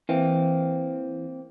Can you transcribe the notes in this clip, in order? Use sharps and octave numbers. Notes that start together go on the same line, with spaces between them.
E3 A#3 C4